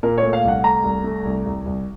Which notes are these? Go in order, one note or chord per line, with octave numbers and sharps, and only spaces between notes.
A#2 A#4
C#5
A3
F5
C2 F#5
A3 A#5
C2
A3
C2
C2
C2